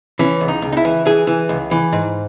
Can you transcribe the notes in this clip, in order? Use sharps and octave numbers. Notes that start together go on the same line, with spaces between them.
E3 C#4
C#2
D#4
C#2
D#4
E4
E3
E3 G#4
E3
C#2
E3
G#2